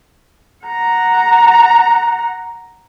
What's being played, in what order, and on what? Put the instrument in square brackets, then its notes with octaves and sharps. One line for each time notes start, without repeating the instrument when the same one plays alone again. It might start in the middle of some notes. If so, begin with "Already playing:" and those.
[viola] F#5 A#5